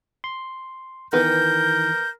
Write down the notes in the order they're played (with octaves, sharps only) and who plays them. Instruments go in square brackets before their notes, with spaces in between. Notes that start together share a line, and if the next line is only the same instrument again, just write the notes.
[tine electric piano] C6
[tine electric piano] D#3 E3 [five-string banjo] B3 B4 [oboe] A#4 [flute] G6